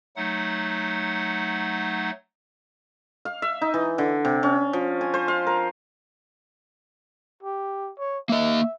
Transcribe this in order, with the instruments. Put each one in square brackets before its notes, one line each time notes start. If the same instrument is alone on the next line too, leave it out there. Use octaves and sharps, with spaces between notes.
[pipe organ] F#3 A3 D#4 F#5
[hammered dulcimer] F5
E5
D#4
E3
D3
C3
C#4
F3
G#5
C5
F5
A#4
[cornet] G4
C#5
[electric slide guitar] A#3 D#5 [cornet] E5